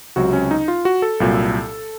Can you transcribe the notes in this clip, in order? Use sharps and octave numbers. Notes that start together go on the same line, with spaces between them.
C#2 C3 F#3 F#4
C#4
D#4
F4
F#4
A4
C2 A#2 F#3